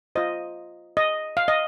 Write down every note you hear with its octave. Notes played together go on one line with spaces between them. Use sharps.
F4 C5 D#5
D#5
F5
D#5